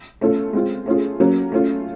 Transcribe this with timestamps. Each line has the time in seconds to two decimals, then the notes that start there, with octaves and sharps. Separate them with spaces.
0.21 A3 C#4 F4 A4
0.53 G#3 C4 F4
0.86 A3 C#4 F4 G#4
1.20 F#3 A#3 C#4
1.52 A3 C#4 F4